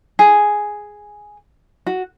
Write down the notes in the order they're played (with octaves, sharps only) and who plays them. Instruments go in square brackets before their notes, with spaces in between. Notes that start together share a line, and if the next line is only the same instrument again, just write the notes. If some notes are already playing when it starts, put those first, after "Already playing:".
[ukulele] G#4
F#4